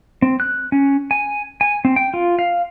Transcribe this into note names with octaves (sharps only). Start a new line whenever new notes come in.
C4
F#6
C#4
G#5
G#5
C4
G5
F4
F5